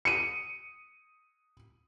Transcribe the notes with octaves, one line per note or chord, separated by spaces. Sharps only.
C#7 D#7